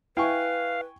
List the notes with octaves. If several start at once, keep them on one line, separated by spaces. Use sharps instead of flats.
E4 B4 F5 G5 G#5 C#6